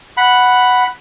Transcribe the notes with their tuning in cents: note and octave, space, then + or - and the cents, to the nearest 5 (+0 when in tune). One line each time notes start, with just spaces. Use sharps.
F#5 +0 B5 +0